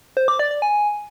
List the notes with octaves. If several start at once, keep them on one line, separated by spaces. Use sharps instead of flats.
C5
D6
D5
D5
G#5